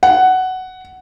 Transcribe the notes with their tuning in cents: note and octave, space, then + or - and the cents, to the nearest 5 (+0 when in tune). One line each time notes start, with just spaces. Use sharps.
F#5 +10